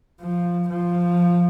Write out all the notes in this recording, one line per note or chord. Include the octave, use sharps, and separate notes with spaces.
F3
F3